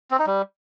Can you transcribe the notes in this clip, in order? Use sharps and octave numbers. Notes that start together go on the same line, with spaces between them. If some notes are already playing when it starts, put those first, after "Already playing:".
C4
D#4
G3